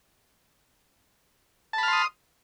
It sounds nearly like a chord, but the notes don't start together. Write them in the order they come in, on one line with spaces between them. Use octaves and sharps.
A5 B5 F6 C6 D#6